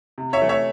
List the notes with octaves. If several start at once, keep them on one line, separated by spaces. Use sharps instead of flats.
C3
C#5 E5
E3 A3
C#5 E5